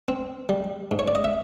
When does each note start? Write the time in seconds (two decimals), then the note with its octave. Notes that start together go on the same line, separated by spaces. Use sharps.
0.08 C4
0.49 G3
0.91 G#2
0.99 C#5
1.08 D5
1.15 D#5
1.24 E5